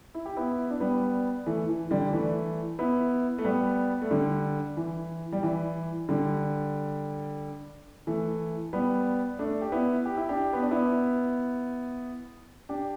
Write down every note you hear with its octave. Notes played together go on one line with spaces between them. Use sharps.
E4
G4
B3 E4
D4
G3 B3
E3 A3
E3
D3 G3
E3 A3
B3 E4
A3
G3 B3
A3
D3 G3
E3
G3
E3
D3 G3
E3 A3
G3 B3
A3 D4
G4
B3 E4
G4
E4
D4 G4
B3
D4
B3 E4
D4 G4